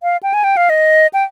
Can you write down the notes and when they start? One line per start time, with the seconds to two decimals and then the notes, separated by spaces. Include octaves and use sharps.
0.03 F5
0.23 G5
0.34 G#5
0.44 G5
0.57 F5
0.70 D#5
1.13 G5